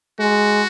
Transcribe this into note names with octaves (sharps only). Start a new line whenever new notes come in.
G#3 F#4